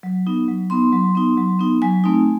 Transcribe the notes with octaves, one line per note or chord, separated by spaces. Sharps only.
F#3
B3 D#4
F#3
B3 D#4 C6
F#3
B3 D#4
F#3
B3 D#4
F#3 G#5
A3 C4 D#4